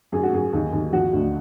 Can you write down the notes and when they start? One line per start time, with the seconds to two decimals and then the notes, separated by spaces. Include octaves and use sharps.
0.12 F#2 G#4
0.23 F#4
0.33 F#2 G#4
0.53 D#2
0.73 D#2
0.92 F3 F#4
1.13 D2